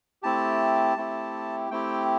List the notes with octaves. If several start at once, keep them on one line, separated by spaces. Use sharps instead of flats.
A3 C4 E4 G4 A5
A3 C4 E4 G4
A3 C4 E4 G4 G5